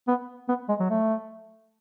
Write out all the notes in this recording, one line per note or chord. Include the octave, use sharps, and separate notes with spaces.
B3
B3
G#3
F#3
A3